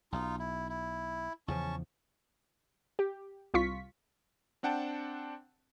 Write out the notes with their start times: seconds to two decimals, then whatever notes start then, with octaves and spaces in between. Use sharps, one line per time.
0.12 B1 D#4 F4
0.39 E4
0.69 E4
1.48 E2 C#3 F3 C#4 A5 C#6
2.99 G4
3.54 C2 F4 C#6 B6
4.63 C4 D4 F#5 G5 A5